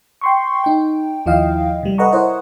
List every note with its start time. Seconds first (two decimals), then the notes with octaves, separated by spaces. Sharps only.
0.21 G5 C6 C#6
0.64 D#4 G5
1.26 D#2 F3 E4 D#5 F5 G5
1.83 C3 G3
1.98 A4 B4 D#5 F#5 A#5 C#6
2.13 E4 A#4 C5 C#5 D#5 F#5